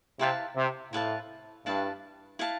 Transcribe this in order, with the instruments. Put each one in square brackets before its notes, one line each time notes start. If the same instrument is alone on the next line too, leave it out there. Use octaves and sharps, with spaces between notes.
[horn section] C3 [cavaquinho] E4 B4 F5 A5
[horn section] C3
[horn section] A2 [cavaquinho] E4 B4 F5 A5
[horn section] G2 [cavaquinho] E4 B4 F5 A5
[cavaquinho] E4 B4 F5 A5